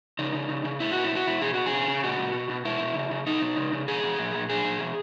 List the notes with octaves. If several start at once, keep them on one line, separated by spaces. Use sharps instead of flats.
C#3 D#4
C#3
C#3
C#3
A#2 E4
A#2 F#4
E4
B2 F#4
B2 E4
B2 G#4
B2 F#4
G#4
C#3
C#3
A#2 F#4
A#2
B2
B2
B2 E4
B2
C#3
C#3
B2 D#4
B2
C#3
C#3
B2 G#4
B2
A#2
A#2
A#2 G#4
A#2
B2